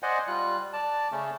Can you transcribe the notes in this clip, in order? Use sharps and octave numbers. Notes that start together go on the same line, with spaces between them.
C5 D5 D#5 F#5 G#5
G3 F4 F#6
D5 A5
C#3 A3 C#4